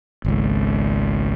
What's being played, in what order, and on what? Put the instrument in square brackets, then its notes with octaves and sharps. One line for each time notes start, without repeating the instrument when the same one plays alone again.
[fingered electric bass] G#1 C#2